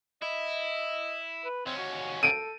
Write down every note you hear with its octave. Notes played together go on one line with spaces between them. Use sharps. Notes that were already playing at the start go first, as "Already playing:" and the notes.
E4 D#5
B4
D#2 C4 C#4
F#4
A4 D7 D#7